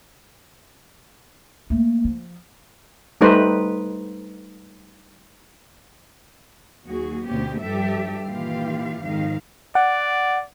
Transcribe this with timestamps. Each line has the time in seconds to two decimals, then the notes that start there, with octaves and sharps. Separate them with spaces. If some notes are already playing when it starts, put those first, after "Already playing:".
1.70 A3 A#3
2.04 F3
3.21 G3 A3 D#4 B4 C5
6.87 D#2 F#3 F#4 G#4
7.26 D2 B2 A#3 C4 C#4 G4
7.60 G2 F3 G3 G4 A4 E5
8.27 A#2 D#3 E3 F4 G4 F5
9.01 F2 G#2 D#3 G#3 F5
9.75 D5 F#5